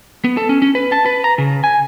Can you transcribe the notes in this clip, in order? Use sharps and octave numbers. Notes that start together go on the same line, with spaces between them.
B3
A4
C#4
C#4
B4
A5
B4
A#5
C#3
G#5